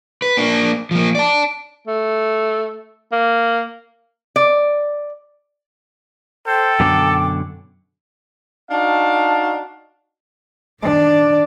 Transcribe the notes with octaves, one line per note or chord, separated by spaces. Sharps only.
B4
A#3 D4
F3 A#3
D5 A5
A3
A#3
D5
A4 C5 G5
F#2 B2 D3 D6
D4 D#4 F#4 F5 A5
D#3 D4 D5